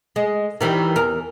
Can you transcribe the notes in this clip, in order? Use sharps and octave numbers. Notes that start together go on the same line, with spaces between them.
G#3
D#3 E3 G3
E2 A#4